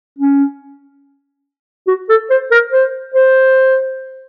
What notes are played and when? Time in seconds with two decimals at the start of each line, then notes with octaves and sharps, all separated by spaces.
0.19 C#4
1.88 F#4
2.09 A4
2.30 C5
2.51 A#4
2.72 C5
3.15 C5